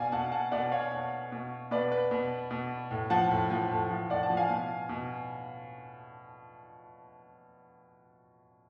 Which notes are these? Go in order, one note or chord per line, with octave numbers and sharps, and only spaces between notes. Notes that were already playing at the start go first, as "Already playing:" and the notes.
Already playing: B2 D5 F5 G#5
B2 F#5 A5
F#5 A5
B2 D5 F#5
C#5 F5
B2
B2
B2 B4 D5
B4
B2
B2
A2
F3 F#5 A5
A2
F3
A2
F3
A2 D5 F#5
F#5 A5
F3
F5 G#5
B2
B2